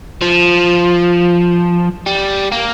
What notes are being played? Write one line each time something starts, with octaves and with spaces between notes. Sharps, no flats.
F3
G3
A#3